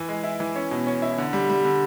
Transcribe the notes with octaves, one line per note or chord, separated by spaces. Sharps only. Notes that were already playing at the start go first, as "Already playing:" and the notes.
Already playing: E3
G#3
E4
E3
C#4
B2
C#4
E4
D3
G3
G3
D3